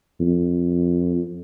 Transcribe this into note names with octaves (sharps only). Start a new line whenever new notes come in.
F2